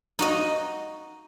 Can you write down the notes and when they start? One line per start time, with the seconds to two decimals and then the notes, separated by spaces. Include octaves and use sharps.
0.19 D#4 F#4 D#5